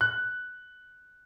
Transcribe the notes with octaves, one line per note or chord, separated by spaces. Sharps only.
F#6